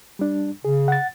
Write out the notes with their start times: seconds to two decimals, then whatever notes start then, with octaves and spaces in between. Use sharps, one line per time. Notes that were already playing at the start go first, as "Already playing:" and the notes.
0.19 G3 D4
0.65 C#3 G#4
0.88 F#5 A6